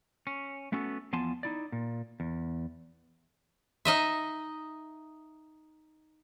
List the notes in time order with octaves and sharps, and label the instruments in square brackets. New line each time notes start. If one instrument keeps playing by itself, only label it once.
[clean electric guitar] C#4
A3 B3 C#4 F#4 A4
E2 F3 B3 G#5 A5 C6
D#4 E4 D5
A#2
E2
[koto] D#4 D#5 E5